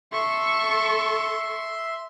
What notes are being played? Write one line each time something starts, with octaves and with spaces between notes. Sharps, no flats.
A4 E5 C6 C#6